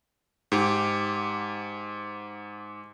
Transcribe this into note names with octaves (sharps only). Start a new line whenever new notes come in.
G#2 G4